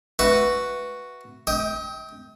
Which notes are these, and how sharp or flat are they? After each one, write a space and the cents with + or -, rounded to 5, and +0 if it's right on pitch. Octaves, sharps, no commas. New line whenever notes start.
F#4 +0 B4 +0 E5 +10
D#5 +45 G5 +0 D#6 +0